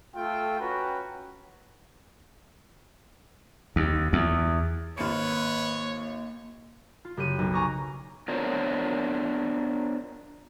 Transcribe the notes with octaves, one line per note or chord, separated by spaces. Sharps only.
A3 F4 A4 G5
C#4 F#4 B4 G5 A#5
D#2
E2
G#1 A#3 B4 C#5 F6 C#7
F4
F#1 G4 F#6 D#7
B1
G#5 A#5 C#6 D6 A#6
B3 D4 F4 A#4 C5 C#5